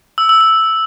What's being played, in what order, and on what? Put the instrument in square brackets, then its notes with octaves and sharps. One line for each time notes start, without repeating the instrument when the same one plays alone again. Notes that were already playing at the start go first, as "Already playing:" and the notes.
[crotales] E6
E6
E6